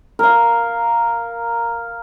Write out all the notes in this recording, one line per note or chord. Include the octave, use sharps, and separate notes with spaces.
A#4 F5